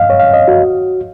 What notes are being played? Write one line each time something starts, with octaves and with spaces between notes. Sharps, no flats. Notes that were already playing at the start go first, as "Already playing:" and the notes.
Already playing: D#5 F5
C#5
F5
D#5
F#4